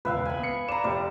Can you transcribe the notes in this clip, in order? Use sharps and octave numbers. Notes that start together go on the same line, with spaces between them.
E1 C#2 B4 E5 F5
G#5 B5
B3 C#7
D5 A#5 B5 E7
F1 G4 D5